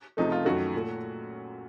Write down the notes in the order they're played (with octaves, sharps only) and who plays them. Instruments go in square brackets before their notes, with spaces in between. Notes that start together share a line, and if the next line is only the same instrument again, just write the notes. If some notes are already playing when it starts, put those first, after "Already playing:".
[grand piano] C#2 C3 F3 A3 D#4
F4
F#2 D#3 A3 F#4
A#2 A3